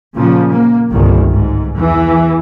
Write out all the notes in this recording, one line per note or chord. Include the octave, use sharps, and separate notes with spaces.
A#2 C#3 F3
A#3
G1 C2 D#3
G#2
E2 E3